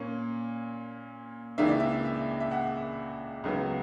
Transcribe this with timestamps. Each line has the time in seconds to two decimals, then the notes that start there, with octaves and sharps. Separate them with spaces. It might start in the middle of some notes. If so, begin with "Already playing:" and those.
Already playing: A#2 A#3 C#4
1.58 C#2 C#3 E3 A#3 D4 E5
1.68 D5
1.80 E5
2.05 E5
2.40 E5
2.51 F#5
3.44 C#2 C#3 F#3 B3